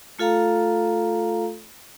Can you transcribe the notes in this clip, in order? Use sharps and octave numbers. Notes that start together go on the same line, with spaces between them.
A3 F4 A4 F5 A#5